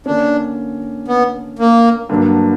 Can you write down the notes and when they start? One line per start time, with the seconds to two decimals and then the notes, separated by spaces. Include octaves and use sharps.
0.06 D3 A#3 C#4 D4
1.08 B3
1.59 A#3
2.09 G2 D3 F#3 A#3 D4